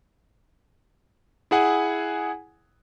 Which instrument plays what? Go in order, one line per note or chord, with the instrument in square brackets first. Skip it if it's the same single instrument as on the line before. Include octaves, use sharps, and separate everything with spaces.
[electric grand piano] E4 G#4 F#5 G#5